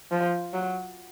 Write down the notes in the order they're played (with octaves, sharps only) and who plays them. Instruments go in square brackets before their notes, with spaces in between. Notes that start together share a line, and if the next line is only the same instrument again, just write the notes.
[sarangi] F3
F#3